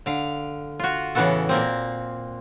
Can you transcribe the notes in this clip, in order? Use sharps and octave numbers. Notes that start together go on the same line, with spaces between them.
D3 F5
F4 F#4
A2 C#3 E3 B3 F#4 A4
A#2 A#3 C4